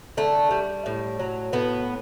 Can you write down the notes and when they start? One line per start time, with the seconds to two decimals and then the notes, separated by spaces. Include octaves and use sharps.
0.17 D3 A3
0.51 G3
0.86 A2
1.19 F#3
1.53 A2 B3